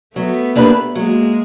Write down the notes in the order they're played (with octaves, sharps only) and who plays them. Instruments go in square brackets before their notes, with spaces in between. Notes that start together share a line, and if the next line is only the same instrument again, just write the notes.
[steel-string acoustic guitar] F#3 [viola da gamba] A3 B3
[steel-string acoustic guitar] A#3 D4 G4 B4
[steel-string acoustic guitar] F#3 [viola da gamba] G#3 A#3